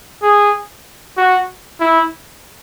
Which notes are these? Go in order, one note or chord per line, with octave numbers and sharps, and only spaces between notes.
G#4
F#4
E4